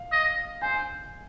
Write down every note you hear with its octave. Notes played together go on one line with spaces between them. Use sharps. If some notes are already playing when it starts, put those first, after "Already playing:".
Already playing: F5
D#5
C5 G#5